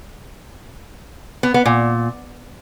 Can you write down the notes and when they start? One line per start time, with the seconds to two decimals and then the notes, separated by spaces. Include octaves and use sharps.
1.43 B3
1.54 B3
1.66 A#2